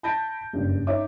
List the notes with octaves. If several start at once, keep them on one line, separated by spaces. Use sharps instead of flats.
A5 B5 G6 A6 A#6 D7
F#1 G2
D#4 C#5 E5 D6